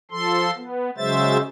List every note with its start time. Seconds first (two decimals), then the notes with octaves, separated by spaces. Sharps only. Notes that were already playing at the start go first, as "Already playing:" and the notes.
0.11 F3 A4 C6
0.57 B3
0.97 C#3 F#3 G#3 C5 E5 A6